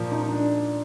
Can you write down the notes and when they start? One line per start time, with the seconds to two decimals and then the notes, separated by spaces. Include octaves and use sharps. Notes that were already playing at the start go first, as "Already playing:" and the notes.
Already playing: A#2 F3
0.12 D#4
0.22 D#4
0.32 D4